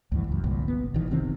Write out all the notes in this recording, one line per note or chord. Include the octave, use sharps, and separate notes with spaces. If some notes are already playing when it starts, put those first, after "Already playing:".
D2 G2 E3
C#2 F#2
G1 C2 A#2
B3
A#1 D#3 E3
F1 C3 D#3 C4